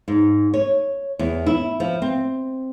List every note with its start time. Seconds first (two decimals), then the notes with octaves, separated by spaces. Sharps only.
0.08 G#2
0.54 C#5
1.19 E2
1.46 E4
1.80 F3
2.02 C4